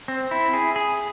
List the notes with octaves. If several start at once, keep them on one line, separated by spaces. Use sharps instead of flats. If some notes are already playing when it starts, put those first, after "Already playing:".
C4
E4
G#4
G#4